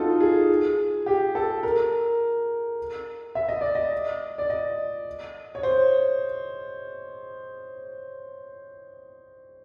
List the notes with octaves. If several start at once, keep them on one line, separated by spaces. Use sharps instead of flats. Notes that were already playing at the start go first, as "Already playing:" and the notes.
Already playing: D#4 F4 F#4 A4
G#4
G4
A4
A#4
E5
D#5
D5
D#5
D5
D#5
C#5
C5